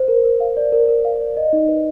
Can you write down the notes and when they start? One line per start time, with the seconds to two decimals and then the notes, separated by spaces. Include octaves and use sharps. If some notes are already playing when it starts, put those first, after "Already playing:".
Already playing: C5
0.08 A#4
0.24 A#4
0.40 F5
0.57 D5
0.72 A#4
0.88 A#4
1.05 F5
1.20 D5
1.37 D#5
1.53 D#4
1.68 B4